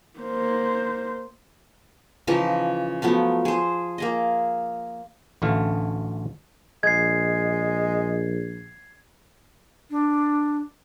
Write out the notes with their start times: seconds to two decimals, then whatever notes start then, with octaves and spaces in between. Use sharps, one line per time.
0.20 A#3 C5
2.27 C#3 E3 F3 D#4
3.02 F3 F#3 A3 B3
3.45 G#4 C5
3.98 A#3 G#4 D#5
5.42 A1 D2 D3 E3 A3 F5
6.83 A#1 G#3 G#6 C7
9.91 D4